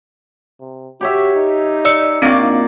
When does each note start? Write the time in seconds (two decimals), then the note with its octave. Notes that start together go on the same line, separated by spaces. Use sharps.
0.60 C3
1.01 F#4 G4 C#5 E5
1.36 D#4
1.85 D5 E6 C#7
2.22 A#2 C4 D4 D#4 F#4 D6